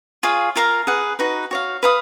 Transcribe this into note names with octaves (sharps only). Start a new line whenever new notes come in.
F4 G#4 C#5 F5
F4 A#4 F5 A#5
G#4 B4 F#5
D#4 F#4 B4
F#4 C#5 F5
B4 F5 B5 D#6